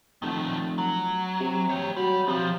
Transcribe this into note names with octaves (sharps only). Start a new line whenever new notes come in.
F1 D#3 A3
F#3
C3
G4 C#5
F#3 G3
B1 C3 F3